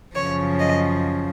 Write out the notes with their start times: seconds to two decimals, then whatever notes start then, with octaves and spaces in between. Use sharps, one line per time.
0.15 F#2 C#3 F3 C#5
0.59 D#5